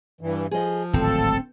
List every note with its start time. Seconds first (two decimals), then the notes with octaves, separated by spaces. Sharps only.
0.21 G2 E3
0.51 F3 G#4 D#5
0.93 D1 G#1 C4 A4